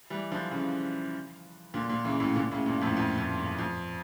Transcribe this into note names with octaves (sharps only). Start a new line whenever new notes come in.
E3 G3
D3 F3
C#3 E3
A#2 D3
A#2 D3
C#3 E3
A2 C#3
A#2 D3
A2 C#3
G2 A#2
F2 A2
F2
F2 A2
G2
F2